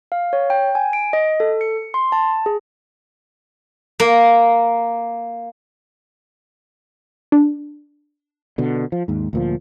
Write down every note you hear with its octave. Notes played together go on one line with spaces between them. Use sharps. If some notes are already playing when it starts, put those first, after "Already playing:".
F5
C#5
G5
G#5
D7
D#5
A4
C#7
C6
A5
G#4
A#3
D4
B2 D3
F3
D#2 G#2
D2 A#2 F3